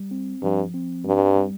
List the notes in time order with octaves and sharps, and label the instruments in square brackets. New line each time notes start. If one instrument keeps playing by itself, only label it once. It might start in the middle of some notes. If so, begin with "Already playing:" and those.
Already playing: [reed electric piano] G3
C4
[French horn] G2 [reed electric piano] F3
[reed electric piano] C4
[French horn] G2 [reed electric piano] G3
[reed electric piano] G3